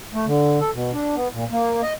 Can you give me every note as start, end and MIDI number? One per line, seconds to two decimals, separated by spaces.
0.14 0.26 57
0.26 0.59 50
0.61 0.71 69
0.74 0.91 47
0.93 1.15 62
1.15 1.28 59
1.33 1.45 46
1.52 1.81 58
1.83 1.93 75